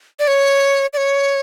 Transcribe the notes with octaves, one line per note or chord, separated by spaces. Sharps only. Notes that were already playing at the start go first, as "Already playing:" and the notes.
D5
C#5
D5
C#5